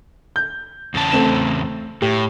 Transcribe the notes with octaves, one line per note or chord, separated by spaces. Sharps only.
G6
E2 C#3 A5
A3 C4 E7
A2 G4